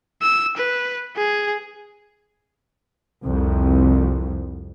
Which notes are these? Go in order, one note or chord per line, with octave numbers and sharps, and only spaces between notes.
E6
B4
G#4
C2 F2